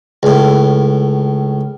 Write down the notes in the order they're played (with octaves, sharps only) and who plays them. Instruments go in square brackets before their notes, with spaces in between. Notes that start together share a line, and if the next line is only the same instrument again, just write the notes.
[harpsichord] C#2 A2